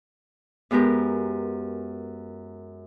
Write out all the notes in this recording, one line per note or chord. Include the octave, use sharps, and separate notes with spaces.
F#2 G#3 B3 G4 A#4